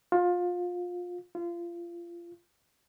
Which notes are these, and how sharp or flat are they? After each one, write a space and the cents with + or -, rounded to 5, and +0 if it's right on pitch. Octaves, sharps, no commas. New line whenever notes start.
F4 +25
F4 -25